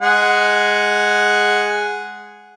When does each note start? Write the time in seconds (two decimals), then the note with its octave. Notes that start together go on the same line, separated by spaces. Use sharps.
0.02 G#3 G#4 F#5